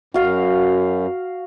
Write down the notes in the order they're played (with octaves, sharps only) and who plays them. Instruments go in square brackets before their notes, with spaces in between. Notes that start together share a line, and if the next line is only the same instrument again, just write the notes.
[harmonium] F#2 [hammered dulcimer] F#4 F5